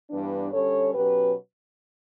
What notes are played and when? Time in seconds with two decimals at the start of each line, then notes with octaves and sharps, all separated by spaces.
0.10 G2 E3 G3 B3 D4
0.52 D3 G3 C#4 A4 C#5
0.94 B2 F#3 C#4 G4 B4